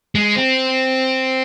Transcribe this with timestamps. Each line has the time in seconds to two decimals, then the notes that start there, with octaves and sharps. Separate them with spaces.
0.15 G#3
0.36 C4